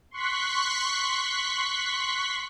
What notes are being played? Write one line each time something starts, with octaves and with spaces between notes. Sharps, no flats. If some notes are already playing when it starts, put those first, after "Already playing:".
C6 C#6 F#6 B6